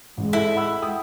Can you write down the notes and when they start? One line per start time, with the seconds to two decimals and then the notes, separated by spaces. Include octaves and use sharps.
0.17 A1 G#3
0.33 E4 A4
0.56 F#5 B5 E6
0.82 G5 D#6